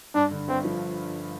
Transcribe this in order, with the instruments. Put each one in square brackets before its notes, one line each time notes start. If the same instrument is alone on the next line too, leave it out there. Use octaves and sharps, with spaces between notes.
[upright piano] G2 [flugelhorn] D4
[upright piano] D3
[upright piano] G1 [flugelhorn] C4
[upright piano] F3